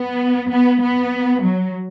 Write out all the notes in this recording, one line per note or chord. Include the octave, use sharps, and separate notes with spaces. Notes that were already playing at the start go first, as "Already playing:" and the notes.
Already playing: B3
B3
B3
F#3